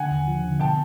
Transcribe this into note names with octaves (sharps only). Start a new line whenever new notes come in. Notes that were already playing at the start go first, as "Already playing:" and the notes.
Already playing: D3 F#5 G#5
D#2
F3
D3
B2 G5 A5